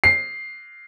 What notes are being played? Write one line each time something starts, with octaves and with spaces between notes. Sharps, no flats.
C7